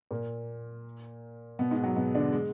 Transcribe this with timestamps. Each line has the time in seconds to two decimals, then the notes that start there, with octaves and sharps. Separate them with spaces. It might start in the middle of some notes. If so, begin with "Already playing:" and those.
0.11 A#2 A#3
1.59 B2 B3
1.71 G#2 G#3
1.84 F#3
1.96 B2 B3
2.15 D3 D4
2.32 G#3